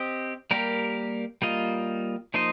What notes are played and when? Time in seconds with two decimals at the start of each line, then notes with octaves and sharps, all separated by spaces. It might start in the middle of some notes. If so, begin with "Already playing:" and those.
Already playing: C4 G4 D#5
0.51 G3 A#3 G4 A#4
1.42 G3 A#3 F4 D#5
2.34 F3 A#3 D#4 C5 D#5